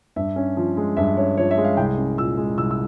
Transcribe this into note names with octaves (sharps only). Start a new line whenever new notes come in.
G2 E5
C#4
F3
G#3
G2 E5
C#4 C#5
F3 C#5
E5
G#3
F5
C2 G5
C#4
A#2 E6
G#3
C2 E6
E6